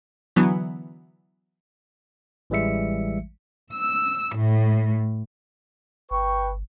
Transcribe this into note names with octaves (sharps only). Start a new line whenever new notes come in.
D3 E3 F#3 B3
A1 E3 G3 G#3 E5 C#7
E6
A2
G1 B4 G5 C#6